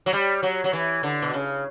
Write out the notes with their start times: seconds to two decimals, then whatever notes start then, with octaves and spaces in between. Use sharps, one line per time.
0.06 F#3
0.13 G3
0.43 F#3
0.64 F#3
0.73 E3
1.03 D3
1.22 B2
1.33 C#3